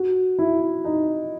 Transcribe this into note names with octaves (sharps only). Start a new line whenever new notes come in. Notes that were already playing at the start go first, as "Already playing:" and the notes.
Already playing: F#4
E4
D#4